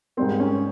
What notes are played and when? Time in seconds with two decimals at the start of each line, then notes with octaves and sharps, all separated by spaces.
0.17 G#2 G3 A#3 C4
0.40 C#4